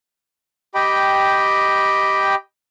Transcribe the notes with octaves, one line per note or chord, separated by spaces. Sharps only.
G4 D#5 G5 B5